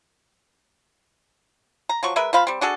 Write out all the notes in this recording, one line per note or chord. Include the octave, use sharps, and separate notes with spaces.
A#5
F3 F#3 C#6
G#3 A#4 B4 E5
F3 C5 F5 B5
G3 C4
D4 F#4 G#4 A4